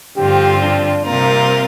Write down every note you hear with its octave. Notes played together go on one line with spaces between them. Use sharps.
G2 D3 F3 C4 F4 G4
D4
C3 G3 A#3 C4 F4 A#4